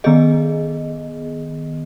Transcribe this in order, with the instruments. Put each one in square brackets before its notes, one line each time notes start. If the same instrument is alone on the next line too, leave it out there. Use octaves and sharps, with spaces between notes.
[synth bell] D#3 B3 G#4 D#5